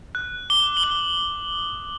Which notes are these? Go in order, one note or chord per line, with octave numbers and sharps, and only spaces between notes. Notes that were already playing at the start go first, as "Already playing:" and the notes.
F#6
D6 G7
F#7
F#6 G7
D6
D#6